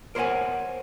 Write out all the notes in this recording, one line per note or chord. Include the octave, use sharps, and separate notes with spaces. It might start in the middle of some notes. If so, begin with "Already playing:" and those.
A#4 C5 C#5 D#5 F#5 G#5